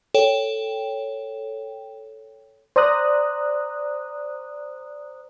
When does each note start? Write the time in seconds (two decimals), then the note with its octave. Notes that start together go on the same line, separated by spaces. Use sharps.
0.14 A4 C#5 G5
2.76 C5 D5 A#5 D#6 F#6